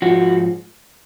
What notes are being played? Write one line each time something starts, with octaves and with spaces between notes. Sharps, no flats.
G#2 F3 F#4